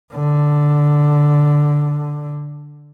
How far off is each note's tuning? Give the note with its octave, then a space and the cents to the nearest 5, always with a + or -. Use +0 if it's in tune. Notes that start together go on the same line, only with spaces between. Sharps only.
D3 +0